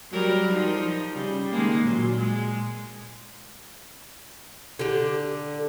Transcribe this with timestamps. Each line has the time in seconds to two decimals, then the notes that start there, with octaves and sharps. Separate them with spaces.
0.11 F#3 G3 A#4
0.52 F3 D#4
1.13 C#3 G3
1.52 D#3 G#3 A#3
1.83 A#2 F#3
2.17 G#3
4.79 D3 G4